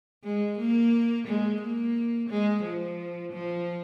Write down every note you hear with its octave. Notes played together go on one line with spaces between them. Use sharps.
G#3
A#3
G#3
A#3
G#3
F3
F3